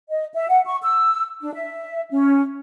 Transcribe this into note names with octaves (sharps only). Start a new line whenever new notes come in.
D#5
E5
F#5
C#6
E6
D4
E5
C#4